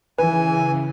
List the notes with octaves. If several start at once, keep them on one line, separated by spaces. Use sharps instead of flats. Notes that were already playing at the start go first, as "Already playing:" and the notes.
C#3 E3 B4 G#5